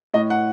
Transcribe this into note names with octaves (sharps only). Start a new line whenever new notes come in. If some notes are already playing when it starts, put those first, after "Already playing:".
A2 D#5
F#5